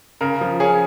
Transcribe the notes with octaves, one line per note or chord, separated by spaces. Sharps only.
C#3 A#4
F3
C#4 G#4